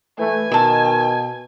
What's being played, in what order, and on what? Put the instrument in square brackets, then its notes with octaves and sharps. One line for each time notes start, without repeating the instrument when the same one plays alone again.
[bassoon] E3 [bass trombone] A3 [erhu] G#5
[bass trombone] B2 [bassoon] D#3 [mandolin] A5 E6